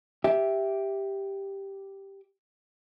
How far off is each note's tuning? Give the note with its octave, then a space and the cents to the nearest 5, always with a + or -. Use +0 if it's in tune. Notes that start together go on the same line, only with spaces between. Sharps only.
G4 +0 E5 +0